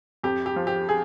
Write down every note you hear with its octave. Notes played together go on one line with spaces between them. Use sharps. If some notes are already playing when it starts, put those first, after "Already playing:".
F2 G4
G4
F3
G4
G#4